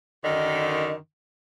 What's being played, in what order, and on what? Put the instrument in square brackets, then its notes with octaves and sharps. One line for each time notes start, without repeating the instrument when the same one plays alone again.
[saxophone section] F#2 D3 D#3 [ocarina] D#5